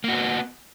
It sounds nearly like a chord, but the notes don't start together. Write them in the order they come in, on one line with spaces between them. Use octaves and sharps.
A#3 F#4 B3